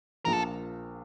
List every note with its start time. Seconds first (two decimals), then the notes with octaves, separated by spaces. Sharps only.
0.25 A#1 A#2 F3 A#4
0.33 A4